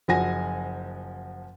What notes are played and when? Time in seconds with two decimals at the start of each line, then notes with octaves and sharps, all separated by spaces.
0.08 F#1 F3 F#4 F#5 G#5 A#6